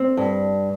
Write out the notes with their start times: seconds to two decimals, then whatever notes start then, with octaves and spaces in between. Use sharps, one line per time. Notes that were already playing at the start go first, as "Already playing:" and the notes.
Already playing: C4
0.17 G2